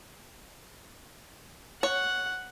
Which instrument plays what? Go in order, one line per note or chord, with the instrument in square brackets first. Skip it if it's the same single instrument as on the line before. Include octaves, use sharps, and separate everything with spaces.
[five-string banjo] C#5 [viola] F#5